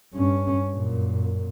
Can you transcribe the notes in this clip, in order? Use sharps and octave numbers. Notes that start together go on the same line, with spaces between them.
G2 C#4
F#2 A#2